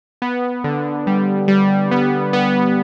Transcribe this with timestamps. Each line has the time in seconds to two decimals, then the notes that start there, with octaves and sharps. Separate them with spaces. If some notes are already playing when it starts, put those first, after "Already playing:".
0.22 B3
0.64 D3
1.07 G3
1.48 G3
1.91 B3
2.33 B3